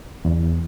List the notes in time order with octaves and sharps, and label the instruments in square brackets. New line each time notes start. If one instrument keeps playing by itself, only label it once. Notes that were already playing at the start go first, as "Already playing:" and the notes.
[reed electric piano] E2